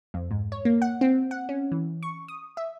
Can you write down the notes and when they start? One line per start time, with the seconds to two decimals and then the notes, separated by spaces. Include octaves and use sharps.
0.14 F2
0.31 G#2
0.52 C#5
0.65 A#3
0.82 F#5
1.01 C4
1.31 F#5
1.49 C#4
1.72 E3
2.03 C#6
2.28 D#6
2.57 E5